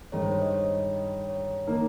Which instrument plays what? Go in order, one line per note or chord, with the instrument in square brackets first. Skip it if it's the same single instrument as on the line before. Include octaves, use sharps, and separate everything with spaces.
[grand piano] G2 D#3 G#3 D#4 [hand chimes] C#5
[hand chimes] C5
C#5
D#5
C#5
C#5
[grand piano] D#3 A#3 D#4